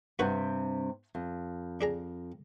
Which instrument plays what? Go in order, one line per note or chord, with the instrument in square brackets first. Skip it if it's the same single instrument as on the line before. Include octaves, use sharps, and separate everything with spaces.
[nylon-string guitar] G2 C3 G3 [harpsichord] F#4 B4 C#5
[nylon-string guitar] F2
[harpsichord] D4 G#4 A#5